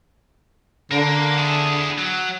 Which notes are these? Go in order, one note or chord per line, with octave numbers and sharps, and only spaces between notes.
D3 A#3
E4 G#4
F#3